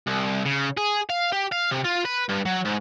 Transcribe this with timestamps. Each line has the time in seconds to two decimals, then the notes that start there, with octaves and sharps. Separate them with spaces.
0.07 C2
0.45 C#3
0.77 G#4
1.10 F5
1.33 G4
1.52 F5
1.72 C3
1.85 F4
2.05 B4
2.29 G2
2.46 F#3
2.65 G#2